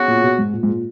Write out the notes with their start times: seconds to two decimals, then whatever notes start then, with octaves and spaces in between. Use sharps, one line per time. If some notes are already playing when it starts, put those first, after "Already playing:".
Already playing: C#3 F#3 B3 F#4
0.08 A#2
0.24 B2
0.39 G#2
0.53 A#2
0.63 G#2
0.69 A#2